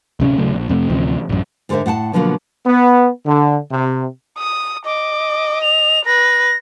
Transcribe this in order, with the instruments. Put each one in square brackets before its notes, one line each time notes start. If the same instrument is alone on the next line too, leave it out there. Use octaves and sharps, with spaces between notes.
[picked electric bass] D1 C3 C4 C#4
D#1 C#3 F#3 A3
A#1
F2 C3 A3
A1 D2 C3 F3
A1 F#2
[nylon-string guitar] G#2 D3 E4 A#4 C5 E5
A2 F#5 G5 A5
B2 D3 F3 F#3 A#3
[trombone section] B3
D3
C3
[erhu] D#6
[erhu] D#5 [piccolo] D6
[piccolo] F7
[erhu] B4 [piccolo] A#6